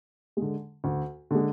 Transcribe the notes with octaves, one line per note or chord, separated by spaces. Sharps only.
D3 G#3
D2
D3 G#3